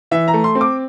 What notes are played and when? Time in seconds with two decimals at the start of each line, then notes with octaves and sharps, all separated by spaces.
0.11 E3 E5
0.28 A#5
0.34 A3
0.44 C6
0.55 C4
0.61 D6